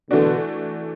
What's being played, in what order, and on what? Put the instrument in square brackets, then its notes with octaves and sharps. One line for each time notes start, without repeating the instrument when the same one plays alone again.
[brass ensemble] B2 D3 [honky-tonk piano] E3 A3 D4 F#4